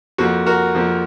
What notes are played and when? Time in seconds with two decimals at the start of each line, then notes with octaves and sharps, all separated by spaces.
0.18 F2 F3 A#3 F#4
0.46 F#4 A#4
0.75 F2 F3 A#3